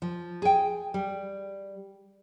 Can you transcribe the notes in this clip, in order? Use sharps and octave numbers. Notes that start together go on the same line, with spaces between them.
F3
G#4 G5
G3